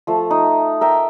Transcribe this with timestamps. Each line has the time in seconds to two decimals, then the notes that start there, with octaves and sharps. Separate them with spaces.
0.07 F3 A3
0.30 D#4
0.81 A#4 E5 G5 A#5